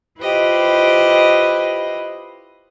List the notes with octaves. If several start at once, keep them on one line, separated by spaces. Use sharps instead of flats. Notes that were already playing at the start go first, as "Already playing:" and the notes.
E4 F4 G4 B4 C5 D#5